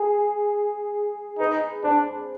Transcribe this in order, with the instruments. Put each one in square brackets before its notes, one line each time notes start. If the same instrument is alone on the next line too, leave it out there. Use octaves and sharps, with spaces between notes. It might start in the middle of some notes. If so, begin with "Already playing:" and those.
Already playing: [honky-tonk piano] G#4
[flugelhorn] D#4 [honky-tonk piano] B4
[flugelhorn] D4 [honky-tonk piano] C5